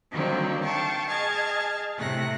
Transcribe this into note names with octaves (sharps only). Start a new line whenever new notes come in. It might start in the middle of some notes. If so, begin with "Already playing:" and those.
D3 D#3 F#3 G3 A#3 C4
F5 G5 A5 C#6
G#4 D#5 A5 F6 G#6
A2 C3 A3 F#6 A#6